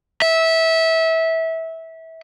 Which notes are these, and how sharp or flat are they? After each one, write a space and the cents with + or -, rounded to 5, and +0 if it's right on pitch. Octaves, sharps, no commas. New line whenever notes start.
E5 -20